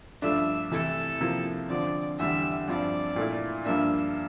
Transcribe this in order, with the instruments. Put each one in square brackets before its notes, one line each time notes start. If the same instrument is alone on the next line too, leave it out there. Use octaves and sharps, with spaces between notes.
[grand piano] G2 F3 A3 D4 [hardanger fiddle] E5
[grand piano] C3 E3 A3 E4 [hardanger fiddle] A4
[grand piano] C3 F3 A#3 E4
[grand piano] D3 F3 C4 [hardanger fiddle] D5
[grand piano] E2 D3 G3 [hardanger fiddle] E5
[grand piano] G2 F3 C4 [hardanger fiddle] D5
[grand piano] A#2 A3 E4
[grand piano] G2 F3 A#3 D4 [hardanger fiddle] E5